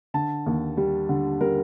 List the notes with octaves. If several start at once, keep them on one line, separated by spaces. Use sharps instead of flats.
D3 A5
D#2
G3
D3
G3 A#4